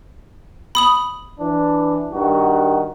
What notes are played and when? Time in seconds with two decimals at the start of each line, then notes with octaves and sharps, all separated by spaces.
0.75 B5 D#6 F#7
1.40 E3 D4
2.13 G2 D#3 F#4